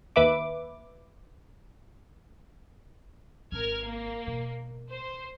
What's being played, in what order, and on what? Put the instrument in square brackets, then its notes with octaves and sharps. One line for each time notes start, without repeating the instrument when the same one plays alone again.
[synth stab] D#2 B4 E5 D6
[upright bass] G#1 [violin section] A#4 F6 G#6
[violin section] A#3
[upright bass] B2
[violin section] C5